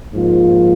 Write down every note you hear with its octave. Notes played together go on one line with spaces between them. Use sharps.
G#2 F3 A#3 F4